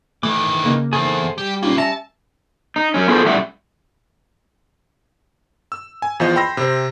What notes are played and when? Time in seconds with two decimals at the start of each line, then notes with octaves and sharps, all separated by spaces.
0.23 D#3 E3 A3 D6
0.64 C#3 A#3 D#4
0.93 E2 G#4 A4 C5
1.38 G3 G4
1.63 C#2 A#3 C#4 D#4 F4
1.78 G3 C#4 E5 A5 A#5
2.76 D#4
2.94 F#2 C#4
3.08 B3 F4 G#4 A4 B4 C5
3.25 A2 G3 E5 F#5
5.72 E6
6.02 G#5
6.20 E2 F3 F4 C5 D#5
6.36 G5 B5 C6 E6 A#6
6.57 C3 C5